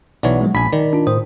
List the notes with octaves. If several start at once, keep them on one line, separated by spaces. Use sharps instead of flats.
B1 E3 C#5 D5 F#5
F#3 G#3
A#1 G#5 B5 B6
D#3 D5
D4 F4
A2 C5 D#6